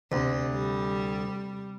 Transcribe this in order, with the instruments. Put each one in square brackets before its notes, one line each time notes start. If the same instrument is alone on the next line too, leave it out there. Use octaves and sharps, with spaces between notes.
[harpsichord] D2 [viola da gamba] C3
[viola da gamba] G3